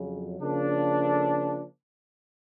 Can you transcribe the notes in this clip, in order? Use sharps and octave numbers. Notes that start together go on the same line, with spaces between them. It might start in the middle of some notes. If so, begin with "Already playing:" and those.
Already playing: F2 C#3 F#3
C#3 F3 A#3 D4
A4